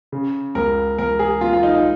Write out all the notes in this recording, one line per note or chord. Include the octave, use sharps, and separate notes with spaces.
C#3
C#2 A#4
C#2 A#4
G#4
A#3 F4
F4
D#4
D#4